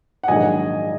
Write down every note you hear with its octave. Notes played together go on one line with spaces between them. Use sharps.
F#5
A#1 G#2 D#3 F#3 D#5 G#5